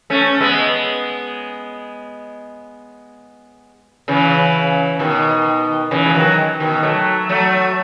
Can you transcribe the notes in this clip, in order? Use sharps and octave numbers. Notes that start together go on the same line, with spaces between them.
A3 C#4
G#3 B3
C#3 E3
B2 D#3
C#3 E3
G#3
D#3 F#3
B2 D#3
F#3 A3
F#3 A3